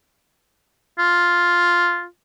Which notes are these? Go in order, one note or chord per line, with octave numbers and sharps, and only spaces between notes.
F4